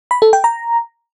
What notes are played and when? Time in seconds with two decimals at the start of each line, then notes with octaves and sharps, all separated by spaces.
0.11 B5
0.22 A4
0.33 G5
0.44 A#5